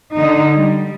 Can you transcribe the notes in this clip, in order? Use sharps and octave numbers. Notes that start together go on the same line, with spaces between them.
D3 D#4
G3